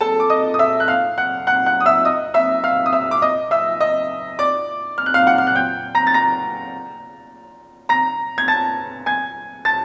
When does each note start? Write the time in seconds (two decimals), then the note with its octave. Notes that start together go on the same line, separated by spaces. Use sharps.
0.01 A4 A5
0.20 D6
0.30 D#5 D#6
0.54 D#6
0.59 E5 E6
0.80 F#6
0.88 F5 F6
1.18 F#5 F#6
1.47 F#5 F#6
1.66 F#5 F#6
1.81 D#6
1.86 E5 E6
2.05 D#5 D#6
2.34 E5 E6
2.64 F5 F6
2.86 D#6
2.93 E5 E6
3.11 D6
3.22 D#5 D#6
3.51 E5 E6
3.80 D#5 D#6
4.39 D5 D6
4.98 F6
5.06 F#6
5.14 F5 F6
5.27 F#5 F#6
5.38 F6
5.47 F#6
5.56 G5 G6
5.95 A#5 A#6
6.07 A6
6.14 A#5 A#6
7.89 A#5 A#6
8.38 G#6
8.48 A5 A6
9.06 G#5 G#6
9.65 A5 A6